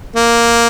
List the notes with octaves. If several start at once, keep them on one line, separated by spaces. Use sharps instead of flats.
A#3